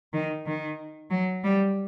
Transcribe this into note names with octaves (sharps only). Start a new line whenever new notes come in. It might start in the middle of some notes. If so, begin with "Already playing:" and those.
D#3
D#3
F#3
G3